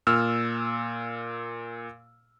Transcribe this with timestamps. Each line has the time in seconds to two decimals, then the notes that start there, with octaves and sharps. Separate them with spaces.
0.07 A#2 E6 F6